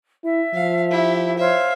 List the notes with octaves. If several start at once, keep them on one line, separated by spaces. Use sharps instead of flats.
E4 E5
F3 F5
E4 G4
C5 C#5 E5 F5